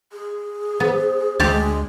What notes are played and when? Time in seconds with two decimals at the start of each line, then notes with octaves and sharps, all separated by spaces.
0.12 G#4
0.80 B3 C5
1.40 D2 G#3 G4 D5 A5